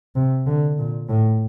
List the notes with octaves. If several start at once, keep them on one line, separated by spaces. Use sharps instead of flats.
C3
D3
A#2
A2